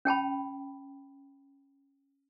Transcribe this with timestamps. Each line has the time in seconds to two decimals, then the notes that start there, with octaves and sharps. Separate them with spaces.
0.05 C#4 G5 A5 B5